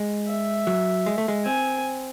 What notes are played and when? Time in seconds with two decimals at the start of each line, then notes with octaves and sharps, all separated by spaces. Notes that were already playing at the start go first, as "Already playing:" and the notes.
Already playing: G#3
0.26 E5
0.67 F#3
1.06 G#3
1.18 A3
1.28 G#3
1.45 C4 G#5